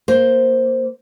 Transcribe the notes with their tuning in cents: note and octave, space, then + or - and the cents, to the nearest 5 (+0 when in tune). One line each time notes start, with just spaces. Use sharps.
A#3 +0 C5 +0